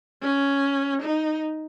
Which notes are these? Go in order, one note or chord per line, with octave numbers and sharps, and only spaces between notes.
C#4
D#4